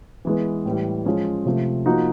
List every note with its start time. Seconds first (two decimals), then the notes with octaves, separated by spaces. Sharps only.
0.25 E3 G#3 B3
0.65 A2 E3 G3
1.05 F3 G#3 C#4
1.46 C3 F3 A3
1.86 F3 A#3 D#4 F#4